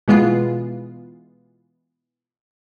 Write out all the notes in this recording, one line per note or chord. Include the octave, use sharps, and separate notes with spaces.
B2 E3 G#3 B3 F4